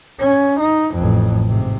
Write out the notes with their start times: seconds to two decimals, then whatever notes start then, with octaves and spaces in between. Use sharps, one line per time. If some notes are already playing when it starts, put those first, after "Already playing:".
0.19 C#4
0.60 D#4
0.95 A1 F2
1.48 G#2 C3